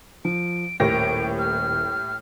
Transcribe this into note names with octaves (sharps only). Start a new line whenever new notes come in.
F3 D7
D#1 A2 G4 A#4 A#6 D7
F6